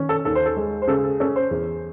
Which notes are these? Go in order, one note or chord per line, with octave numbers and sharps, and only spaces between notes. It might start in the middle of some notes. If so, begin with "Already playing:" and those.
Already playing: D#3 C#4
A4
D#2 A4
C5
A4
G#3
C5
C#3 A4
A4
C#4 A4
C5
E2